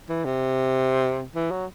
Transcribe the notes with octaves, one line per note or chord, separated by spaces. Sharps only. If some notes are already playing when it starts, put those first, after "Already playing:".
E3
C3
E3
F#3